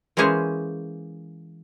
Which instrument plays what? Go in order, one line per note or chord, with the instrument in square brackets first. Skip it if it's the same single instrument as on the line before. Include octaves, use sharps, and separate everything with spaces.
[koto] E3 G#3 A#3 C#4 G#4 C5